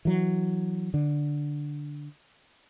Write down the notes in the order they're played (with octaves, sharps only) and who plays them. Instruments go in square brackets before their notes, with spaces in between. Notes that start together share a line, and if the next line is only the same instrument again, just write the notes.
[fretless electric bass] E3 F#3
D3